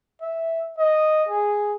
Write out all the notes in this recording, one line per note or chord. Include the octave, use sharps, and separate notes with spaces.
E5
D#5
G#4